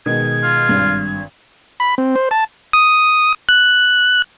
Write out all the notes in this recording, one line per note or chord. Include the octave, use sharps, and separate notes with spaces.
B2 D#3 G#3 G#6
F4
G#1 G2
B5
C4
C5
A5
D#6
F#6